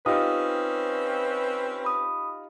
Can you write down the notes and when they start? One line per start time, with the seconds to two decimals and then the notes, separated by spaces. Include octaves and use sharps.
0.06 C4 C#4 D#4 F4 G4 B4 D#6
1.85 B5 D#6